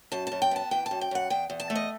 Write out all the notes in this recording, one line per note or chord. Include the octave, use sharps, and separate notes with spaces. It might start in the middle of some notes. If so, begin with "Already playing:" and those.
F#2 A5
F#2 A5
G5
B3 A5
E3 G5
A5
F#2
G5
F#2 F#5
E2 G5
E2
A5
A3
D#5